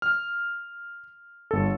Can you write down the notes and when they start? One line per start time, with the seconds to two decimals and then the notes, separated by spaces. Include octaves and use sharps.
0.02 F6
1.51 G1 A4